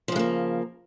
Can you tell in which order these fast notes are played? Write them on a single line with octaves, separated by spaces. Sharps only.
F3 C#3 G#3 A#3